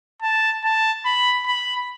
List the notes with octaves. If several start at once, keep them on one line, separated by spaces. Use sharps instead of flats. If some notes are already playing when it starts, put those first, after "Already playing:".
A5
A5
B5
B5